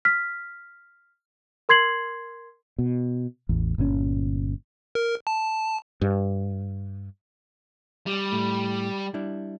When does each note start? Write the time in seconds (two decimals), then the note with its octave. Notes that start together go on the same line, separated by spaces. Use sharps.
0.05 F6 B6
1.69 A#4 C6 G#6 C7 F#7
2.79 B2
3.49 A1 E2
3.78 G1 A#2 D3 C#4
4.95 A#4
5.27 A5
6.01 G2
8.07 G3
8.32 A2 A3
9.14 G3 D4 E4